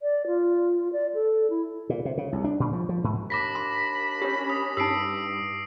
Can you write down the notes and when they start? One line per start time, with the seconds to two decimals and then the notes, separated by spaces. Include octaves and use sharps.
0.02 D5
0.27 F4
0.93 D5
1.14 A4
1.50 E4
1.89 A#2
2.05 C3
2.18 C#3
2.32 C2
2.44 D4
2.60 A#2
2.73 F3
2.89 F3
3.04 G#2
3.30 D#2 D4 B5 D6 A#6 B6
3.55 C6
4.22 C#4 G4 C#5
4.50 D#6
4.77 G2 D#4 G4 E6 C7 D7